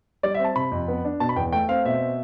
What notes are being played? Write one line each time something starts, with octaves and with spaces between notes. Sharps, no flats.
G3 D5
E5
C4
A5
C3 B5
F2
B3
D4
B2 A5
B5
E2 G5
A3 G5
C4 F5
B2 E5